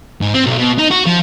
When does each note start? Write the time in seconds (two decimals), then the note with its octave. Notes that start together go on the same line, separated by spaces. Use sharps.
0.21 G#2
0.34 C4
0.46 B1
0.58 B2
0.79 D#4
0.91 F#4
1.06 F3